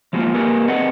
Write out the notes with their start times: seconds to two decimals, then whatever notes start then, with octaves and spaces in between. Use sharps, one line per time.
0.13 F3 F#3 G#3 A#3 F4 F#4
0.34 A#3 G4 G#4 A#4 B4 G#5
0.68 C4 G#4 B4 D#5 F#5